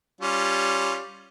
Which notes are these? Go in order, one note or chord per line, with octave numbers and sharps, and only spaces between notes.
G3 C#4 F4